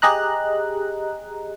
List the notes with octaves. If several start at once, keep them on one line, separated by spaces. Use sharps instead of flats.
G4 G#4 D#5 A#5 F#6